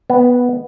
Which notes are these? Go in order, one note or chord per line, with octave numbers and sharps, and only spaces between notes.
B3